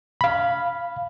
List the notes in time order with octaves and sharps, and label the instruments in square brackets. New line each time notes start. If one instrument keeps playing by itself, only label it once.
[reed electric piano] F5 B5